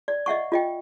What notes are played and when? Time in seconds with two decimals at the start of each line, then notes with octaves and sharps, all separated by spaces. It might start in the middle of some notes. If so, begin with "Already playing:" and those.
0.08 D5
0.26 D#5 E5 F#5 C#6
0.52 F4 D#5 G5